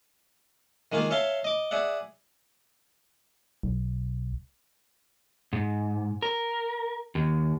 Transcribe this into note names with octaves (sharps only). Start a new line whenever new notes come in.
D#3 G#3 A#3 F4 G#5
C#5 E5 F5 A5 C6
D#5 D6
G#4 D5 E5 F#5
B1
G#2
A#4
D#2